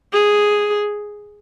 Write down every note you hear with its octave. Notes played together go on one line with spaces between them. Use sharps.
G#4